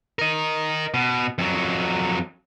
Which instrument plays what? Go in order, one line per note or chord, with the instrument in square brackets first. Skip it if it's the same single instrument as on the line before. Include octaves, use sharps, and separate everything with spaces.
[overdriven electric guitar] A#4 D#5
B2
F2 F#3